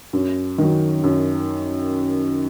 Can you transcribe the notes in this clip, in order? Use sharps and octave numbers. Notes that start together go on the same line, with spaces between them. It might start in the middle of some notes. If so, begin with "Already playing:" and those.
F#2
D#3 F#3
F#2